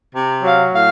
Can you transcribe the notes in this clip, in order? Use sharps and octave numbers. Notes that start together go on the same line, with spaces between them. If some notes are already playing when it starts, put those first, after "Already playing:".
C3
F#3 F5
A2 F5